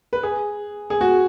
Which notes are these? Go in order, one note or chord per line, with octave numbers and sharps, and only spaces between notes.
B4
G#4
G#4
F#4